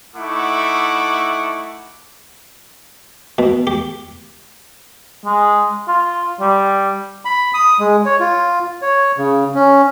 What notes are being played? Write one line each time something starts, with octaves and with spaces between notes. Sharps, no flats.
A3 D#4 E4 F#5 C#6 D6
B2
G4
G#3
F4
G3
B5
D#6
G#3
C#5
F4
C#5
C#3
C#4